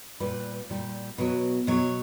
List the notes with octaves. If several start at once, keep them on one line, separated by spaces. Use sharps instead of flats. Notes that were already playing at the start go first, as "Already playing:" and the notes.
A#2 G3 B4
A#2 G3
B2 F#3 B4
B2 F#3 C#5